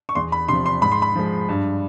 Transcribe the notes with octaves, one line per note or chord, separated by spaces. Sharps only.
C#6
E2 C6
B5
C3 F3 C6
C6
G#2 B5
C6
B5
F3 G#3
G2